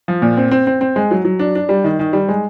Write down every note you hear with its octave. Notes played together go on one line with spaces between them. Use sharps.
F3
A#2
C4
C4
C4
C4
G#3
F#3
F#3
D4
D4
G3
D#3
D#3
G3
G#3